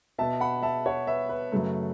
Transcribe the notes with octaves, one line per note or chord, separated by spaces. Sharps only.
B2 B3 E5 A5
F#5 B5
E5 A5
C#5 F#5
B4 E5
B4
F#2 C#3 F#3 A3